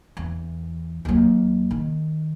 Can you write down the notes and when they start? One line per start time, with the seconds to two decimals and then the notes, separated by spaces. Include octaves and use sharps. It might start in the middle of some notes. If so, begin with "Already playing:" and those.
0.17 E2
1.05 D#2 F#3
1.71 D#3